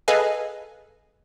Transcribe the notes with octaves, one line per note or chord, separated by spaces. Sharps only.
G#4 A4 B4 D#5 F5 G#5